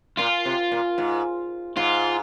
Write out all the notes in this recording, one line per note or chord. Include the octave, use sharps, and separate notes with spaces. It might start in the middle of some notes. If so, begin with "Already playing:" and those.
A#2 F4
C3
A#2
G#2
G#2 F4